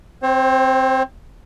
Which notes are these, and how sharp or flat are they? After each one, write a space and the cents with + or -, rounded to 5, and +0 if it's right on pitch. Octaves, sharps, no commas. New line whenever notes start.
C4 +0 C5 +40